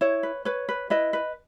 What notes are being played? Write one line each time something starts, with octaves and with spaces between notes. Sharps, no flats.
E4 C#5
B4
B4 C#5
B4
E4 B4 D#5
B4